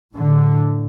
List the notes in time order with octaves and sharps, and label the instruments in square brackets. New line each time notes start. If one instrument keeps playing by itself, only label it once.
[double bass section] A2 D3